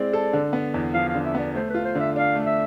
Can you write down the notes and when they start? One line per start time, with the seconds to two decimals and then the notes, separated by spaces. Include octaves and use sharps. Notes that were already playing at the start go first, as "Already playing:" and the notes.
Already playing: G#3 C4 E4 D5
0.13 A4
0.33 D3
0.53 B3
0.74 E2
0.94 F3 F5
1.09 F5
1.15 D3
1.25 E5
1.35 B3 D5
1.55 A3 C5
1.70 F4 B4
1.85 C5
1.95 D3 E5
2.16 D4 F5
2.35 A3
2.46 E5